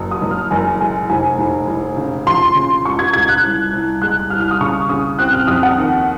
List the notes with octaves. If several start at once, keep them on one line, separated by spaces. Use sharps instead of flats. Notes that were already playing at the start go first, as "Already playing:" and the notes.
Already playing: F#1
D#6
F#1
F6
F#1 G#5
G#3 G#5
F1 G#5
F1
F1
C#3
F3 C6
C#3
C#2 C#6
G#6
C#2 G#6
F#6
C2
C2
G#3 F#6
C2 F6
F6
D#6
C#3 C#6
C#3 D#6
C4 F#6
F6
F2 D#6
F#5
D#2